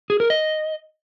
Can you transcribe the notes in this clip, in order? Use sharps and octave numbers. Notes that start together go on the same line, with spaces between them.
G#4
A#4
D#5